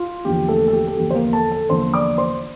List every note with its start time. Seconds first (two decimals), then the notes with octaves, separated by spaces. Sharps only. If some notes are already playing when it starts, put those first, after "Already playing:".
Already playing: F4
0.25 E2 D3 F3 A#3 G4
0.48 A3 A4
0.68 A4
0.73 G4
0.88 A4
0.97 E2 D3 F3 A#3 G4
1.10 C5
1.15 A#3 A#4
1.33 A4 A5
1.51 A4 A5
1.69 E2 D3 F3 A#3 C5 C6
1.93 D5 D6
2.18 C5 C6